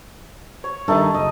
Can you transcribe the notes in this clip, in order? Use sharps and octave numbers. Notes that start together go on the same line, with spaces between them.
C#5
G2 D3 D#3 A3 D#4 A5
F#1 D#5